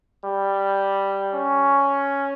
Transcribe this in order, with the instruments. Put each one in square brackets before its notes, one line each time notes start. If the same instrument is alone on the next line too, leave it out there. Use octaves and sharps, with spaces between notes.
[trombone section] G3
C#4